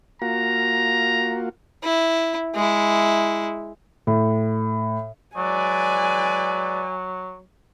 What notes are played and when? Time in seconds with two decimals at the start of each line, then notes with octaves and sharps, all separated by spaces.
0.22 A#3 F4 F#4 A#5
1.83 E4
2.55 G#3 E4
4.07 A2
5.36 F#3 G#3 B4 D5 G#5